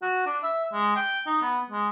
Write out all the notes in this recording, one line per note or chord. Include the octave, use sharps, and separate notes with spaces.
F#4
D4
E5
G#3
G5
D#4
B3
G#3